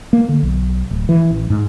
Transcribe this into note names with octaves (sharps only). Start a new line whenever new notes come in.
A#3
D3
B1
D1
E3
A1
G#2